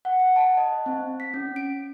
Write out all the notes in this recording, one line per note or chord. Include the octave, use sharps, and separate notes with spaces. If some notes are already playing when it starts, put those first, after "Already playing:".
F#5
F#5
A5
D#5
C4
B6
C#4
D7